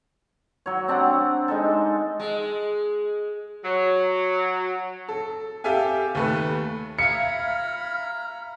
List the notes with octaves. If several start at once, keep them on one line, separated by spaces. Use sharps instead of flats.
F#3 C#5
C4 D4 G4 F#5
G#3 D#4 A4
G#3
F#3
A4
G4 A4 E5 F5 G#5
D#2 A3 B4
E5 F5 A#5 B5 F6 G#6 C#7